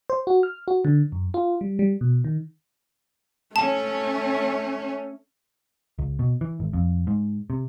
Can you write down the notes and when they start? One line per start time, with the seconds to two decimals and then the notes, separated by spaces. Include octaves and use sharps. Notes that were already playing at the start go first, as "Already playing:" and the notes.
0.10 C5
0.27 F#4
0.43 F6
0.68 F#4
0.85 D3
1.12 F#2
1.34 F4
1.61 G3
1.79 G3
2.01 B2
2.25 D#3
3.56 A3 C#4 A5
5.99 C#2
6.19 B2
6.41 E3
6.60 G#1
6.73 F2
7.07 G#2
7.50 C3